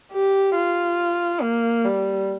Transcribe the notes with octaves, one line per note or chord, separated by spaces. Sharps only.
G4
F4
A#3
G3